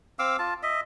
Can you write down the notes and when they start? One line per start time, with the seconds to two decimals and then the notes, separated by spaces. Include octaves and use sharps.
0.19 C4 F5 D6 E6
0.39 F4 A5
0.63 D#5 E5